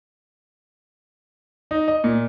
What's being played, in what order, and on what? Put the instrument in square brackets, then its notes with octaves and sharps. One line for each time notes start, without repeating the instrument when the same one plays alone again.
[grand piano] D#4
D#5
A#2